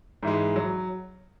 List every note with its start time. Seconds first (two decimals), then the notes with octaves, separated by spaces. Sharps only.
0.23 G#2 E3 G#3
0.56 F#3